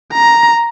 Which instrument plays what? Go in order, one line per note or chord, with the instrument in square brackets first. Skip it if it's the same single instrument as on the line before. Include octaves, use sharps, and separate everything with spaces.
[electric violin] A#5